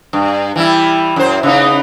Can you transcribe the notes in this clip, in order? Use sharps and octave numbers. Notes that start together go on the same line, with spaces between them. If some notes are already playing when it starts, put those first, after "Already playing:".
G2
E3 G3 E4
F#2 C5
C#3 B3 D#4